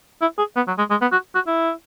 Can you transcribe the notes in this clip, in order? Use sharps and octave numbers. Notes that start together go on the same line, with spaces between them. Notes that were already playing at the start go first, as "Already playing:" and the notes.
E4
G#4
B3
F#3
G#3
G#3
B3
F#4
F#4
E4